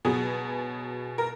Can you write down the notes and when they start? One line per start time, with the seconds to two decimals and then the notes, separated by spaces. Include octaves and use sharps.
0.05 B2 F#3 B3 G#4
1.18 A#4